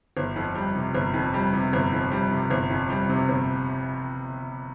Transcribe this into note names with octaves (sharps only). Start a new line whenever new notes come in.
G1
F2
G3
C3
G1
F2
G3
C3
G1
F2
G3
C3
G1
F2
G3
C3
G1